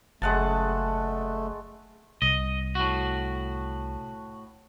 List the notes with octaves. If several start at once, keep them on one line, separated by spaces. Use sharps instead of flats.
F#1 G#3 A3 F#5 A5
C2 D#5
A2 F#4